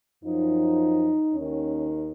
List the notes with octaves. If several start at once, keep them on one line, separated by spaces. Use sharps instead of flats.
F#2 F3 D#4
D#2 D#3 C#4